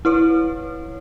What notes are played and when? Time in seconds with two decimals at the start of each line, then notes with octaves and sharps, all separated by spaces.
0.05 E4 B4 C#5